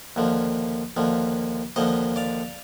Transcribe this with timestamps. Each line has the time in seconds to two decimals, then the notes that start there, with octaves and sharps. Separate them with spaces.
0.16 D#2 D3 F3
0.97 D#2 D3 F3
1.76 D#2 D3 F3 C5 D#5
2.16 D5 F5